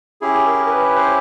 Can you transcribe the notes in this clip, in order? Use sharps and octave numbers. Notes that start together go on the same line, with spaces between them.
C#4 E4 G4 G#4
A#4
A#4
B4
C5